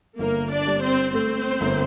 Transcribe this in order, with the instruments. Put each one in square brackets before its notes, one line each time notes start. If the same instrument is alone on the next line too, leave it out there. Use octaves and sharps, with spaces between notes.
[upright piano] G1 [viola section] A#3 A#4
[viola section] D4 D5
[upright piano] G3
[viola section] C4 C5
[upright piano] A3 [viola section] C4 C5
[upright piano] G1